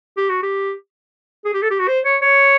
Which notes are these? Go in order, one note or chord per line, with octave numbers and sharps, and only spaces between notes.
G4
F#4
G4
G#4
G4
A4
G4
F#4
C5
C#5
C#5